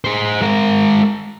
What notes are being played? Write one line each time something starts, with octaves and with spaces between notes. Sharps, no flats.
G#4 C5
G#3 A#4